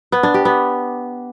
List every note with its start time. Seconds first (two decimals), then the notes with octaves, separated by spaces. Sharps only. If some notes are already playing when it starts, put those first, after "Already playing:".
0.12 B3
0.23 D4
0.34 G4
0.45 B3